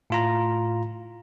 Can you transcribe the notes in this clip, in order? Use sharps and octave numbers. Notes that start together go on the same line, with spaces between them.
A2 F4 A#5